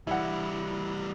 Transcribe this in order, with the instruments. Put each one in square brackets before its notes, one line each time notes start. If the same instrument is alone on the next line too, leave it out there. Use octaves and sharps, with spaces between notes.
[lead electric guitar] E3 G3 [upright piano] E4 F#5